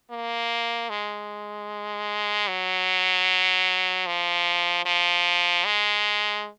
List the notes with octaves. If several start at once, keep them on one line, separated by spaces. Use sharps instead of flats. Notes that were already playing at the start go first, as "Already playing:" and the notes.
A#3
G#3
F#3
F3
F3
G#3